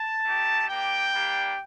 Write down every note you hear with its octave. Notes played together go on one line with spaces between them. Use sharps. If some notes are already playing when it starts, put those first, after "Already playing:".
Already playing: A5
A3 D#4 G4
A#3 D4 G4 G5
G3 A#3 D4 G4